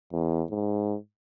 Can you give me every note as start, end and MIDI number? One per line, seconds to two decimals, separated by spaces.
0.12 0.43 40
0.51 0.96 44